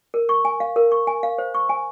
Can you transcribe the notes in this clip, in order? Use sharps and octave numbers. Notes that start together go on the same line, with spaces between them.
A#4
C#6
G#5
F5
A#4
C#6
G#5
F5
C5
C#6
G#5